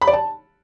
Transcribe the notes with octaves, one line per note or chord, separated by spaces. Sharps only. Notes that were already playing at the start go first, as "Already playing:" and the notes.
B5
D5
A5